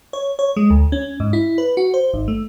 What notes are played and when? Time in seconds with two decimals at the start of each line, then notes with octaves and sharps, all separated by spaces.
0.13 C#5
0.39 C#5
0.56 G#3
0.70 D2
0.92 C#4
1.20 G#2
1.33 E4
1.58 B4
1.77 F#4
1.94 C5
2.14 G#1
2.28 A3